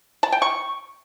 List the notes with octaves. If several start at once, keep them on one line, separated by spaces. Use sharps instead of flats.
A5
G5
C#6